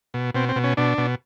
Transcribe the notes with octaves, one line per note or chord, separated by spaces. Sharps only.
B2
B2 C4
C4
B2
C#4
B2 D4
B2